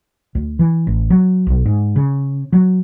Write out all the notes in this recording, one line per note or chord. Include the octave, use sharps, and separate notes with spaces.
D2
E3
A1
F#3
B1
G#2
C#3
F#3